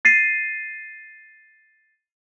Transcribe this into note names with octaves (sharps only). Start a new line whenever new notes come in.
A6 C7 D#7